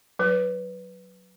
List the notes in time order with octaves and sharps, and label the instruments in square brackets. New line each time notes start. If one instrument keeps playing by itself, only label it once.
[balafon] F#3 B4